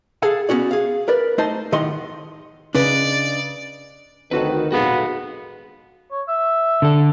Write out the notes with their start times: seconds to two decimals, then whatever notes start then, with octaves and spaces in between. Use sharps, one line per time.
0.22 G#4 A4 F5 F#5
0.49 B3 C#4 F#4 D5
0.71 G#4 F5
1.08 A#4 B4 D5
1.38 A3 D#4 C5 D#5 A5
1.72 A2 D#3 D#5 F#5 C6
2.75 C#3 D4 B4 D5 D#5
4.31 D2 D#3 C4 F#4 A4 B4
4.72 B1 F2 G#3 B3 F#4 A4 F5
6.11 C#5
6.28 E5
6.82 D3 A4